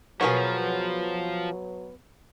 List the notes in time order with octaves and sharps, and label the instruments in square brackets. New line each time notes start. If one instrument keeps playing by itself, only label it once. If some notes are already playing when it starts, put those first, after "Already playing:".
[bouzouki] B2 B4 F#5 [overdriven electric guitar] F3 [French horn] F#3 [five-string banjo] G#4 A#4 C#5